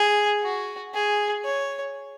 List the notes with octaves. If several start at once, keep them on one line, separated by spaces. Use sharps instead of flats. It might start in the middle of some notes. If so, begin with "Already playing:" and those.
Already playing: G#4
F#4
G#4
C#5